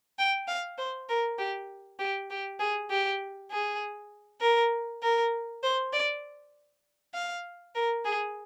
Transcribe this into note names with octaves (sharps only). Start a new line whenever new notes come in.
G5
F5
C5
A#4
G4
G4
G4
G#4
G4
G#4
A#4
A#4
C5
D5
F5
A#4
G#4